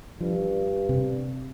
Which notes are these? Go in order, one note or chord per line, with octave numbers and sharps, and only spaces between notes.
G2 F3
C3